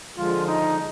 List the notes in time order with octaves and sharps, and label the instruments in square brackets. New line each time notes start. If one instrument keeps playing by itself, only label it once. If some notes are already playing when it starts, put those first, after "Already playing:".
[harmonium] D3 F3 G#3 [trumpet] F4
[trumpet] D#4